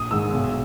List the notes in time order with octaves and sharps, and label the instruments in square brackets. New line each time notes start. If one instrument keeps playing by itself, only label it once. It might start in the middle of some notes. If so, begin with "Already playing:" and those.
Already playing: [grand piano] A#1 D#6
G#2 D#3 G#3 E6
B1